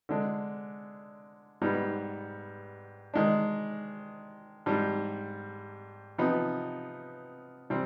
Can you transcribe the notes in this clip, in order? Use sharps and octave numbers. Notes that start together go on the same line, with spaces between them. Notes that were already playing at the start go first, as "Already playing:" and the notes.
D3 G#3 D4
G#2 G3 B3
D#3 G#3 D4
G#2 G3 D4
C3 F3 B3 D#4
C3 G3 C4